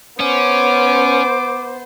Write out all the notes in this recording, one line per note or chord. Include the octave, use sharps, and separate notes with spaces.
B3 C#4 C5 D6